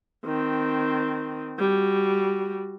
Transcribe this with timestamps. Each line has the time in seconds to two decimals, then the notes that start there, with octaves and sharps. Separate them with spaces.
0.25 D#3 C4
1.59 G3 F#4